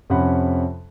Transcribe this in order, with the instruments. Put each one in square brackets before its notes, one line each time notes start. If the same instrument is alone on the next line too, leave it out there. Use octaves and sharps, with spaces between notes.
[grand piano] F2 C3 C#4 F#5 B5